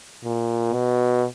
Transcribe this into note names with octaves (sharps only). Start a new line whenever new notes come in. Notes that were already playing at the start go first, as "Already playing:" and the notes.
A#2
B2